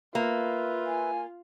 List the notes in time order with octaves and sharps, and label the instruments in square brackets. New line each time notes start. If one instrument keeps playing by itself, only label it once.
[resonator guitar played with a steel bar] A#3 [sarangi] F4 [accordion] B4 E5
[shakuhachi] G#5